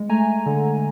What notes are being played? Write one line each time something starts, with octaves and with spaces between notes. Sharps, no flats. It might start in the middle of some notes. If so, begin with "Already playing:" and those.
Already playing: G#3
A3 G#5 A#5
D3